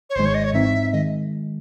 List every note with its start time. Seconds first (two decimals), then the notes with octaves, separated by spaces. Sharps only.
0.10 C#5
0.15 G#1 G#2 D#3 G#3 C5
0.25 C#5
0.35 D#5
0.44 C#5
0.53 G#2 E3 C4 D#4 E5
0.92 D#3 G#3 D#5